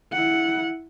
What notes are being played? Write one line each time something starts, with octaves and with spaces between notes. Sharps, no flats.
E4 F#5